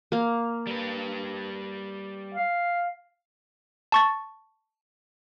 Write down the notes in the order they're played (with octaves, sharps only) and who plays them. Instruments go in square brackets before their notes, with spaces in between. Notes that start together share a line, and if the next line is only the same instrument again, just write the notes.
[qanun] A#3 F5
[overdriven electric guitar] G3 B4
[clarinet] F5
[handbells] A5 C#6 A6